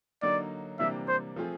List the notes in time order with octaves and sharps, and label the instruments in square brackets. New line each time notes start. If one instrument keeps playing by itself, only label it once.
[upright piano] D3 F#3 A#3 D#4 [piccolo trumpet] D5
[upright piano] C3 E3 G3 A#3 D4 [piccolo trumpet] E5
[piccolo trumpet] C5
[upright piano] F3 A3 C4 F4 G#4